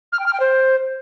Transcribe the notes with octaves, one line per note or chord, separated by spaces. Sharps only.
F6
G5
F6
G5
C5